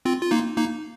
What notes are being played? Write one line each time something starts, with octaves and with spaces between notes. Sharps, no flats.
C4 F4
F4
A#3 D#4
A#3 D#4